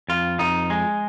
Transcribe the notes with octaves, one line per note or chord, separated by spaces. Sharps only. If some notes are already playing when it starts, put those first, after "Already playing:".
F2 F4
F2 D#4
G#3